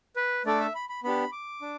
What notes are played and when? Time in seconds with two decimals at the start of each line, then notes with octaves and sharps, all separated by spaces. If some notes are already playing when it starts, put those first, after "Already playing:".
0.16 B4
0.46 A3 D4 A4 D5
0.60 E5
0.75 B5
0.89 B5
1.04 B3 D4 G4 B5
1.32 D6
1.62 D4